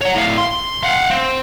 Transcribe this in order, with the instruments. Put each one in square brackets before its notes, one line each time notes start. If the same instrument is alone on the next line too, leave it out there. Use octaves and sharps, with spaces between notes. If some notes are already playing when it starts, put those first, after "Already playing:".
[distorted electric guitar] C#5 F#5
A2 F5
C6
F5 F#5
C4